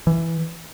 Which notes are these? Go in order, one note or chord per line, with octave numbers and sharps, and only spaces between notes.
E3